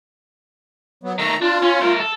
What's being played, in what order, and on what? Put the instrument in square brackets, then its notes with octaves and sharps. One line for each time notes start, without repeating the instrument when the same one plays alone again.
[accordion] F#3 B3
[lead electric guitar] D#3 A3 [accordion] A#5
[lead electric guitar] D4 [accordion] F4
[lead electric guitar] C#4
A3 A#4
A4